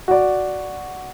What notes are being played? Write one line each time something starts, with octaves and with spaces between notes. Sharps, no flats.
F#4 D5